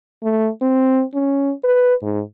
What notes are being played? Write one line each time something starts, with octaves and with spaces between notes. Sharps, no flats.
A3
C4
C#4
B4
G#2